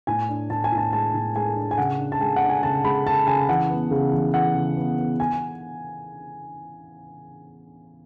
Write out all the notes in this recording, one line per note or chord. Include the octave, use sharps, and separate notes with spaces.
A2 G#5
D4
A2 A5
G#5
A2
A5
G#3 A5
A2
G#3 G#5
D4
G#5
C#3 F#5
D4
A5
G#3 G#5
F#5
D4
G#5
C#3 A5
G#3 B5
C#3 A5
C#3 G#5
E3 F#5
B3
C#3
E3
E3 F#5
C#3
B3
B3
G#5